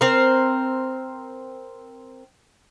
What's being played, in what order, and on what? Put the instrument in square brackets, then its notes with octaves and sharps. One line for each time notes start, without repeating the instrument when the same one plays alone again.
[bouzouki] C4 A#4